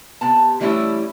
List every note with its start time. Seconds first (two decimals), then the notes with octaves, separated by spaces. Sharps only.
0.21 C3 B3 A5
0.60 E3 G3 A3 C#4 D#4 E4